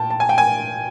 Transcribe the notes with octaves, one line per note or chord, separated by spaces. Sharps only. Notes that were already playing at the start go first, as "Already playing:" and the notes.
Already playing: A#2 G5 A5
A5
G#5
G5
G#5